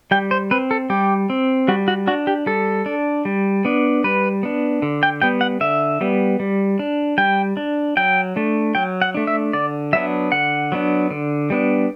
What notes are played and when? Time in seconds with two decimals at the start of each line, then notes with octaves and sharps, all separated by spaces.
0.11 G3 G5
0.31 C5
0.51 C4 B4
0.71 A4
0.90 G3 G4
1.30 C4
1.68 G3 F#4
1.88 F#4
2.07 D4 F#4
2.27 G4
2.46 G3 A4
2.86 D4
3.25 G3
3.65 B3 D4
4.04 G3 B4
4.43 B3 D4
4.82 D3
5.03 G5
5.22 G3 B3 G5
5.41 F#5
5.61 D3 E5
6.01 G3 B3
6.40 G3
6.79 D4
7.18 G3 G5
7.57 D4
7.97 F#3 G5
8.36 A3 D4
8.75 F#3 G5
9.02 F#5
9.14 A3 D4
9.27 E5
9.53 D3 D5
9.93 F#3 B3 D4 E5
10.32 D3 F#5
10.72 F#3 B3 D4
11.11 D3
11.50 G3 B3 D4